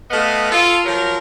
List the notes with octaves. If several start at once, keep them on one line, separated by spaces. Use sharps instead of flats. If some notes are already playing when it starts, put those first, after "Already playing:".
A3 B3 D#5 F5
F4 A4
F3 F#3 A#4